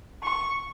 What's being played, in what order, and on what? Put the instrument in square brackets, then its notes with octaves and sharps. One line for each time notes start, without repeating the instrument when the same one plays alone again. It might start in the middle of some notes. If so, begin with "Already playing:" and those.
[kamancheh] C#6